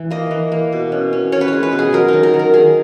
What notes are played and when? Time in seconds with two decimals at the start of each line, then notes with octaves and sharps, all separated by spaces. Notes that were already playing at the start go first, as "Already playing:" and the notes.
Already playing: E3
0.10 A#3 D#5
0.31 E3
0.52 A#3
0.72 B2
0.92 C#4
1.13 C#4
1.32 C#4 C#5
1.41 B4
1.48 G#3 C#5
1.63 B4
1.72 B2
1.79 G#4
1.93 F#3 A#4
2.08 D#3 D#4
2.23 A#4
2.34 D#3
2.39 A#4
2.54 D#3 G#4